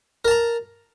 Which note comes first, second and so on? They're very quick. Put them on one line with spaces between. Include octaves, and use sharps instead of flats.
A#4 A5 A#5